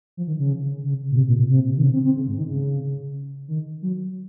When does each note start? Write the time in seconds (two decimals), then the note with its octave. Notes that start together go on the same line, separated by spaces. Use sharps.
0.17 F3
0.27 D#3
0.39 C#3
0.84 C#3
1.11 A#2
1.17 C3
1.28 A#2
1.39 A#2
1.50 C3
1.77 D#3
1.83 C#3
1.94 C4
2.05 C4
2.16 C#3
2.27 G#2
2.37 D#3
2.49 C#3
3.48 D#3
3.82 F#3